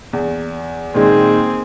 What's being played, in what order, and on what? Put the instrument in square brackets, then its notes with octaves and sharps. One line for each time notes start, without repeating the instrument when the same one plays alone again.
[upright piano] E2
[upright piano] A#2 D#3 G#3 [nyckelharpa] C4 G#4